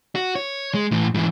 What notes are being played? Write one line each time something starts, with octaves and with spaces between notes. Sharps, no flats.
F#4
C#5
G#3
A2 E3
G#2 E3